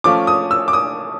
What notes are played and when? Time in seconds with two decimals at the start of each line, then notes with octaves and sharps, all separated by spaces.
0.04 F3 A3 C#4 F4 D6
0.27 D#6
0.51 E6
0.68 D6
0.73 D#6